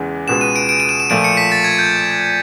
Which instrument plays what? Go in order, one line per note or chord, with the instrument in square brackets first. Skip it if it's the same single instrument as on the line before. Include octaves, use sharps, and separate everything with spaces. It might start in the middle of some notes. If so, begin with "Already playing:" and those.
Already playing: [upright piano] E2 C#3 E3 G#3
[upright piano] C#2 B2 G#3 B3 [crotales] E7
[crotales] D#7
D7
D7
D#7
E7
E7
[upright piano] A#2 F3 A3 [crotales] D7
[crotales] C#7
B6
A6
G#6
G6